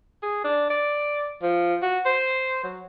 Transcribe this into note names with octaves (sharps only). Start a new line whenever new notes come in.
G#4
D4
D5
F3
F#4
C5
F#3